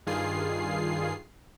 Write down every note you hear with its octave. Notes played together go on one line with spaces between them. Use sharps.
G2 D#3 F4 G#4 C7